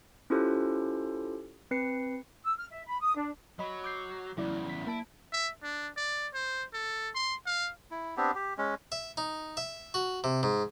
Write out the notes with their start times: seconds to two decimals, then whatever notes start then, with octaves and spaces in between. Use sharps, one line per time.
0.30 C#4 E4 F4 G4 A4 C5
1.71 C4 B4 C7 C#7
2.44 E6
2.57 F6
2.71 E5
2.87 B5
3.01 D#6
3.16 D4
3.59 F#3 D#5 B5
3.84 D6 G6 C7
4.37 E2 C#3 F#3 E4 D5
4.69 B6
4.87 A#3 E4 A5 D7
5.32 E5
5.63 D4
5.97 D5
6.34 C5
6.74 A4
7.15 C6
7.46 F5
7.91 E4
8.17 B3 C4 D4 G4
8.35 G4
8.58 G#3 C#4
8.92 E5
9.17 D#4
9.57 E5
9.94 F#4
10.24 C3
10.43 G#2